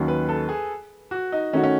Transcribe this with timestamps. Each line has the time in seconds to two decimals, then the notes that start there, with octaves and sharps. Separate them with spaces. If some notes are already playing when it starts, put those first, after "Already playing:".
Already playing: D#2 D#3 F#3 C#4
0.08 B4
0.29 A4
0.49 G#4
1.11 F#4
1.32 D#4
1.53 D#3 A3 C#4 D#4 F#4
1.63 C#4